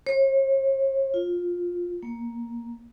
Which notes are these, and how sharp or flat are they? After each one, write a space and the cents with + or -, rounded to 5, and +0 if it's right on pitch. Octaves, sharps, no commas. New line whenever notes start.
C#5 -45
F4 +15
A#3 +5